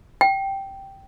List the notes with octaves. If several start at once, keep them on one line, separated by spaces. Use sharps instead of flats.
G5